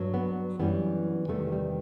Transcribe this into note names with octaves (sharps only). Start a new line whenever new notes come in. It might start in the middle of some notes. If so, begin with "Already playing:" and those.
Already playing: G2 F#3
B3
F#2 E3 G3 B3
E2 C3 D#3 G3 A3
G3